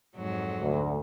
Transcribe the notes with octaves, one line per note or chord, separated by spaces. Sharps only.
F2 G#2 F#3
D2